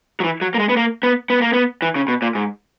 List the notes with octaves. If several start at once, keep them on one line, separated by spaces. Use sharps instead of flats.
F#3
E3
F#3
A#3
G#3
B3
A#3
B3
B3
A#3
B3
E3
C#3
B2
A#2
G#2